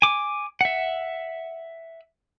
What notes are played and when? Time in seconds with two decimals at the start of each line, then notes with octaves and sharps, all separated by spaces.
0.02 G#5 D6
0.61 E5 F#5